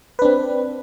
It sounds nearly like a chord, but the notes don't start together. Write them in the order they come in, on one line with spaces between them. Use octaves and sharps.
B4 D4 C4